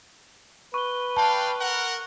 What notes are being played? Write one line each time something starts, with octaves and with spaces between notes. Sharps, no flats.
B4 C#6 G7
D5 F5 G5 A5
A#4 F#5